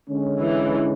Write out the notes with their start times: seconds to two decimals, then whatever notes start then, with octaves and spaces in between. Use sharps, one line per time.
0.08 D3 G#3 C#4
0.40 E3